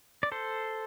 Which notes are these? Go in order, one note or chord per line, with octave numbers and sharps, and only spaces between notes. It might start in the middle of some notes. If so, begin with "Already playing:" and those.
D5
A4 C5